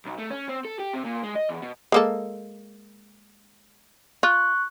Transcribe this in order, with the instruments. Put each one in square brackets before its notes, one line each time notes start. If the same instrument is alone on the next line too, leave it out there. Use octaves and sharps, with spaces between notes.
[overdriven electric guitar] B1
A3
C#4
C4
A4
G4
C3
A#2
G#3
D#5
E2
B2
[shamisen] G#3 A#3 A4
[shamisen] F4 [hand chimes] C#6 F#6